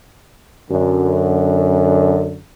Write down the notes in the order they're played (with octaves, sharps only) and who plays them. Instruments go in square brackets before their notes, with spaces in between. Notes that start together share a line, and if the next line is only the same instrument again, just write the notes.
[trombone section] F#2 D3